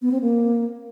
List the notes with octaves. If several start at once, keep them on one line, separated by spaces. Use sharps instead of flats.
B3
C4
A#3